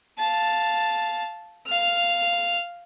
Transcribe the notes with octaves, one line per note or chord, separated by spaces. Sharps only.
F5 A5
F5 F6